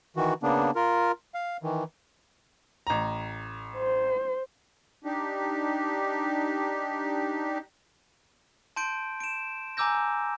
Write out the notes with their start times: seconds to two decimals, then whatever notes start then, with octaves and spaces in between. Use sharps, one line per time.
0.16 D#3 E3 F#4
0.43 C#3 A#3 B3 D4
0.75 F4 A#4
1.34 F5
1.63 D#3 E3
2.87 A1 A#5
3.76 C5
5.05 D4 D#4 G4
8.76 A5 C6 G6 D7
9.20 D7 E7
9.77 G#5 A#5 D6 E6 G6 A#6